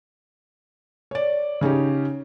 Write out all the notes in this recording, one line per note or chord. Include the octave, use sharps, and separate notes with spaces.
C#5 D5
C#3 C#4 D#4 G4